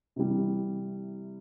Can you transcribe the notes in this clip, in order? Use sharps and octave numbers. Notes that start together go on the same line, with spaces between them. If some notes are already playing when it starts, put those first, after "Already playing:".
C3 E3 G3